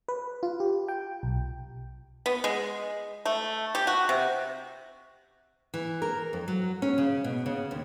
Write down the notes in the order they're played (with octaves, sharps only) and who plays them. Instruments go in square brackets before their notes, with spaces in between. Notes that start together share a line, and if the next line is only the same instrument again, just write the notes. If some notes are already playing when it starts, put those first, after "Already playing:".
[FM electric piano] B4
F4
G4
G5
B1
[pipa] B3
G#3
A3
G4
F#4
C3
[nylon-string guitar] E3
A#4
F2
F#3
C#4
C#3
B2
C#3
D#2